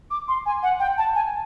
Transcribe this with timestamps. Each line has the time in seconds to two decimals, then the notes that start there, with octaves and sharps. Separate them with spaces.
0.11 D6
0.28 C6
0.46 G#5
0.63 F#5
0.80 G5
0.98 A5
1.15 G#5